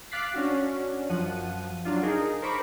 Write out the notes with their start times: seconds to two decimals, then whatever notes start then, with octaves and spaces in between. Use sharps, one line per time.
0.12 F5 D6 F#6 A6 B6 C7
0.34 C#4 D4 F#4
1.09 F#2 F3 F#5 D#7
1.85 F#3 D4 F4
2.03 D#4 G#4 A#4
2.42 A#4 C5 B5 C#6 D6